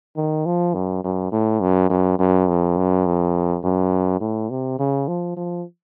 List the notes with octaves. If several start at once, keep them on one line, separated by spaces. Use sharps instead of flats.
D#3
F3
F#2
F#2
A2
F#2
F#2
F#2
F2
F#2
F2
F#2
A2
C3
C#3
F3
F3